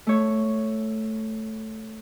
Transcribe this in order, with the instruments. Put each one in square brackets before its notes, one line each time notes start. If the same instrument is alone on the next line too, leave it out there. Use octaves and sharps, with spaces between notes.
[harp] A3 C#5